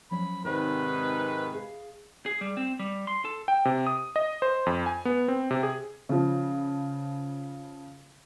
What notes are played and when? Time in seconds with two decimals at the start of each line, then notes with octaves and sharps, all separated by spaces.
0.11 F3 F#3 C#4 B5
0.45 G#2 C3 D#3 C4 B4 C5 D5
1.53 G#4 F5
2.26 G#4
2.41 G3
2.57 C4
2.79 G3
3.07 C6
3.25 A4
3.48 G5
3.65 C3
3.87 D#6
4.16 D#5
4.42 C5
4.66 F2
4.86 G#5
5.05 B3
5.28 C4
5.51 C3
5.63 G#4
6.09 C#3 F3